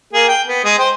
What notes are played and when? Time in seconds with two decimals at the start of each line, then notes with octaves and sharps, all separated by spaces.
0.13 A#3 G#4
0.28 G5
0.47 B3
0.64 G#3 D#6
0.78 C5 G5